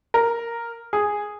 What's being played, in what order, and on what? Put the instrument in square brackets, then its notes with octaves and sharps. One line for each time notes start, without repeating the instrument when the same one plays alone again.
[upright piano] A#4
G#4